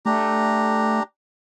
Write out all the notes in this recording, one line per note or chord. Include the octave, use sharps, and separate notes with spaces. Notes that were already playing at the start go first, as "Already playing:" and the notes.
A3 D4 G4 A#5